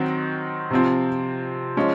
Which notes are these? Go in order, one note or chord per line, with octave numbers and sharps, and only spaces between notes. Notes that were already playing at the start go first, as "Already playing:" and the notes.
Already playing: D#3 F#3 C4 D#4 F#4
C3 F3 C4
F3 G#3 C#4